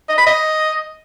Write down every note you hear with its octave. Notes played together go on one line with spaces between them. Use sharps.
D#5
B5
D#5